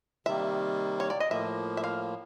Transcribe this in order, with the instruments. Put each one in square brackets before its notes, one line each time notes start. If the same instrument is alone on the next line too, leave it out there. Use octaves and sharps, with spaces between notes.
[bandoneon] C3 D#3 G3 A#3 [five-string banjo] E5
[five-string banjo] C#5
D5
D#5
[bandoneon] A2 F3 A#3 [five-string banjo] E5
[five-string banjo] E5
F5